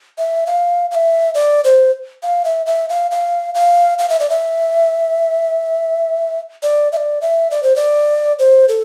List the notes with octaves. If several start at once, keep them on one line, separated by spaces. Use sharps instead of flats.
E5
F5
F5
E5
D5
C5
F5
E5
E5
F5
F5
F5
F5
E5
D5
E5
D5
E5
D5
E5
D5
C5
D5
C5
A4